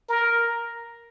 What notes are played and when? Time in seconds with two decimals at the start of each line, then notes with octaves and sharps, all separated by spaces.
0.09 A#4